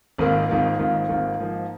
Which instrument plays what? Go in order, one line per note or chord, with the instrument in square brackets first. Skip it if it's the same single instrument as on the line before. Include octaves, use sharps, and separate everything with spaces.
[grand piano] G#1 G#2 D#3 A#3 F4
G#1 G#2 D#3 A#3 F4
G#1 G#2 D#3 A#3 F4
G#1 G#2 D#3 A#3 F4
G#2 F3 A#3 D#4